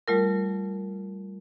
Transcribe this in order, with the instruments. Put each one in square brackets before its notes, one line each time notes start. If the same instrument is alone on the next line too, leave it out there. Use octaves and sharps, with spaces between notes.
[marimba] G3 A3 F4 A#4